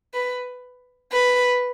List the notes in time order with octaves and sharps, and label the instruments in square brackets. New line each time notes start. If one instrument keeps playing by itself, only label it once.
[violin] B4
B4